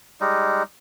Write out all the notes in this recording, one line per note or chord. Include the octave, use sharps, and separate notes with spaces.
G3 G#3 D#4